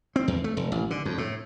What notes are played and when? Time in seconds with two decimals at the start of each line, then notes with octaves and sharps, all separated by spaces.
0.16 C4
0.28 E2
0.44 A3
0.57 F1
0.72 A1
0.91 D3
1.05 F2
1.18 A2